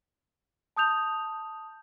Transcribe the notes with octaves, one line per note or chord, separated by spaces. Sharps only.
A5 D#6 G6 F7